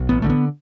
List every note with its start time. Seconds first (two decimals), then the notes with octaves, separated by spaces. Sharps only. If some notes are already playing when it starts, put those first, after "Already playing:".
Already playing: B1
0.09 A1 B3
0.22 D3 A3
0.30 B3